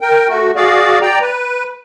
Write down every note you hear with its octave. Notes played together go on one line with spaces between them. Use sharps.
A#4 G5
A3 F#4
F#4 G#4 D5 F5
D5 G5 A#5
B4